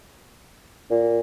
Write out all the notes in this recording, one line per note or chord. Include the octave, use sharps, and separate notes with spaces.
A#2